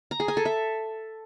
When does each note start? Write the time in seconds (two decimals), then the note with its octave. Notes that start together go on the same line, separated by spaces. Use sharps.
0.11 A#5
0.20 G#4
0.28 G#5
0.37 A4
0.45 E5